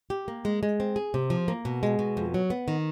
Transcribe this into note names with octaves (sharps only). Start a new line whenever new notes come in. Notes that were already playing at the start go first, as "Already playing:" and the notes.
G4
A#3
G#3
G#3
C4
G#4
C3
F3
A#3
B2
G#3
B2
F2
F#3
B3
D#3